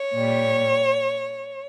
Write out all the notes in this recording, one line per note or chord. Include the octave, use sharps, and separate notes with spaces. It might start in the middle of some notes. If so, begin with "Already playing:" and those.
Already playing: C#5
A#2 G3